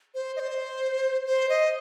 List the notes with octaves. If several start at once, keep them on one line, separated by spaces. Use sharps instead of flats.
C5
D#5
C5
C5
D#5